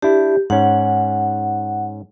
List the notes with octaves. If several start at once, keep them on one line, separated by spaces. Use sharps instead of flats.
D4 E4 G4
G#2 C#4 F#5